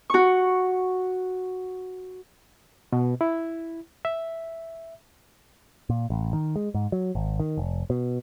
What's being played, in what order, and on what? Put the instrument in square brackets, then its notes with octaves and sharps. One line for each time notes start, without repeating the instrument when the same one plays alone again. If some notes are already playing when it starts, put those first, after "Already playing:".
[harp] F#4 C#6
[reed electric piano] B2
E4
E5
[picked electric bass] A#2
A1
D#3
G#3
G#2
F#3
G#1
D#3
F1
B2